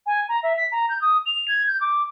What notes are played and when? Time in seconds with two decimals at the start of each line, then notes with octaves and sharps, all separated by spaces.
0.06 G#5
0.29 A#5
0.43 E5
0.57 B6
0.72 A#5
0.89 G6
1.01 D#6
1.26 F7
1.48 G#6
1.67 G6
1.80 D6